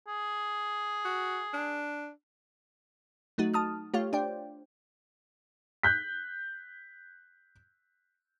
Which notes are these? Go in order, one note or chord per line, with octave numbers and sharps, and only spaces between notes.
G#4
F#4
D4
F#3 A3 D#4 F#4
A5 D#6 F6
A3 F4 G4 C#5 F5
D4 C5 D5 G5
F#6 G6 B6